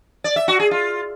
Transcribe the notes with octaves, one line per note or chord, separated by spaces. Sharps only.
D5
E5
F#4
G#4
F4